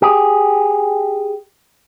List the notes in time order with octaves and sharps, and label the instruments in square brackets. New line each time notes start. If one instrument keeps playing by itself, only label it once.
[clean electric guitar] G4 G#4